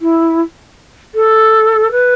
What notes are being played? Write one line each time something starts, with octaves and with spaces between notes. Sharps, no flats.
E4
A4
B4